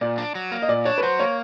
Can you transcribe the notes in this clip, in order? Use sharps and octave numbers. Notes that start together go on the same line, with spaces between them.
A#2 D5
D4
F#3
A#3
D#5
A#2 D5
D4 C#5
B4
F#3 C5
A#3 C#5